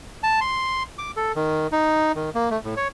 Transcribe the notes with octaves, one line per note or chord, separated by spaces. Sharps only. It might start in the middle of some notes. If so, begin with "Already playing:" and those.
A5
C6
D6
A4
D#3
D#4
D#3
A#3
A3
A2
C#5